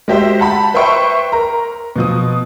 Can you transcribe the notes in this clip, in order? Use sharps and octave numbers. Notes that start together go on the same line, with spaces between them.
G#3 F#4 G4 C5 E5
F#5 A5 B5
B4 C5 E5 G5 C#6
A#4 A#5
B2 F3 D#6